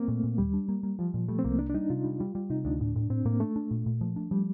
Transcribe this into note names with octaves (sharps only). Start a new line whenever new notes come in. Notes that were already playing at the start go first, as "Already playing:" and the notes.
Already playing: A#3 C4
A#2 A3
A#2
D#2 G3
D4
A#3
A#3
F3 G3
A#2
G3 A3
C4
C2 A#3
A#3 D4
D4
G3 D#4
C3 F4
G3
G3
G3
C3 D#4
D2 D4
A2
A2
A2 C4
A2 A#3
A3 D4
D4
A#2
A#2
F3
D4
F3 G3